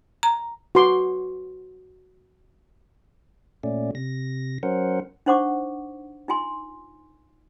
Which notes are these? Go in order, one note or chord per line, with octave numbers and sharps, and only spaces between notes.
A#5
F#4 B4 C6 D6
A#2 A3 C#4 D5
C3 A#6
F#3 C#4 A#4 C5 F#5
D4 D#4 C5 F#5 C#6 D6
D#4 F4 G#5 C6